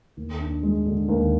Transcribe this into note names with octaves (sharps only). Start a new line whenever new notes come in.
D#2
D4
G#3
D3
D#2